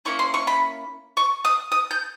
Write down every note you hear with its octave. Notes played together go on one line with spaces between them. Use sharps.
A#3 C#4 E4 C#6
C6
C#6
B5
C#6
D#6
D#6
G6